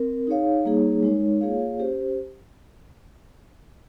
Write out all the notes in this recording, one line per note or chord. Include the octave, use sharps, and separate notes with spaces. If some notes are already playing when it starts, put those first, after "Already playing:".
Already playing: C4 A#4
D#4 G#4 C#5 F5
G3 A#3 D#4 G#4 C#5
G#3 D#4 A#4 C#5
A#3 F4 G#4 C#5 F5
C#4 G4 C5